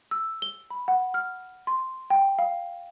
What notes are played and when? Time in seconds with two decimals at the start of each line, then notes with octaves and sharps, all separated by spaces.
0.11 E6
0.42 G7
0.71 B5
0.88 F#5
1.14 F6
1.67 C6
2.10 G5
2.39 F5